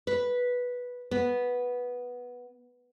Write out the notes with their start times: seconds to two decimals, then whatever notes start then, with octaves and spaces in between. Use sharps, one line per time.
0.07 B4
1.11 B3